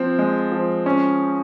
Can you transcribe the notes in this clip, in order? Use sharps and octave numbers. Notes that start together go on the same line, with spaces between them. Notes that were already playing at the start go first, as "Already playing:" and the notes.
Already playing: F3 C4
G#3
F3
C#4